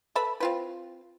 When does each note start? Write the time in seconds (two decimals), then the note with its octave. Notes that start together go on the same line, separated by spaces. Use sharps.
0.15 A4 B4 E5 B5
0.40 C4 F4 B4